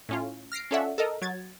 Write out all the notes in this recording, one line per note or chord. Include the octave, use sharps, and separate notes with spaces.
A2 C#4 F4
F6 A#6 C7 D7
C#4 F4 A4 D5 E5 F#5
A4 A#4 D#5
F#3 G#6 A6